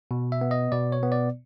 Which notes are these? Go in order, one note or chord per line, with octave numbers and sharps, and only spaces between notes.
B2
E5
B3
D#5
B2 D5
C#5
B3
D5